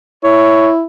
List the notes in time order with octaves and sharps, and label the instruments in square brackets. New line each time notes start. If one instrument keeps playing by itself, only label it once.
[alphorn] E4 [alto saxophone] C#5